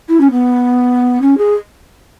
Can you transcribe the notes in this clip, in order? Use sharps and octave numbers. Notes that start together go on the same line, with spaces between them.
E4
C#4
B3
C#4
G#4